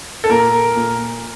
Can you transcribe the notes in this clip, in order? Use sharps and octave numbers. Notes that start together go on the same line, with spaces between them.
A4
A#2 A#4
A#2